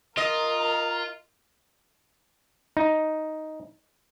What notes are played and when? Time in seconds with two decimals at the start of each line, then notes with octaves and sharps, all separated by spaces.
0.17 F4 A#4 D#5 A#5
2.77 D#4